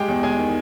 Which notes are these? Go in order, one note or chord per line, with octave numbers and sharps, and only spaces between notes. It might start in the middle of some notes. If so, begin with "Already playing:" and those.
Already playing: G#3 G4 G5
E2
G#3 G#4 G#5
D#3